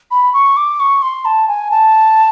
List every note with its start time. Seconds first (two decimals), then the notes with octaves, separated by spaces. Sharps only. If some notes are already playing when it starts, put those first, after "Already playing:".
0.11 B5
0.33 C#6
0.57 D6
0.80 C#6
1.02 C6
1.25 A5
1.48 G#5
1.71 A5